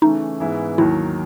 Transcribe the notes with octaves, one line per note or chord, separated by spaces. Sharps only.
C#3 E3 A3 C#4 D#4
G#2 E3 G#3 B3 E4
D#2 D#3 F#3 E4